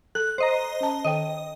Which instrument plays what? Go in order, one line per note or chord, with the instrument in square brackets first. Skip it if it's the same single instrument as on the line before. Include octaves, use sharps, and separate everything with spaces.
[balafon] A4 [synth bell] F#6
[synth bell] C5 D#5 A#5
[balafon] C#4 A5
[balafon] D#3 A4 G5 [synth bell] D#5